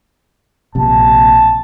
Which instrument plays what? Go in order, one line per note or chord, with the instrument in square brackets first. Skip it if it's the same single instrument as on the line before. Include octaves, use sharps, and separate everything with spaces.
[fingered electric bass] A#1 C3 [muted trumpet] A5